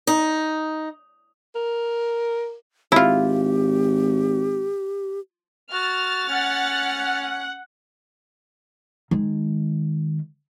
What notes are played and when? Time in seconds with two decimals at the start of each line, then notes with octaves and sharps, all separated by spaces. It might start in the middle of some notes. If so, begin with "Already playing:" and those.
0.07 D#4
1.55 A#4
2.92 G#1 E4 F4 G4
5.73 F#4 F6 A6
6.29 C#4 F#5
9.11 D#3 G#3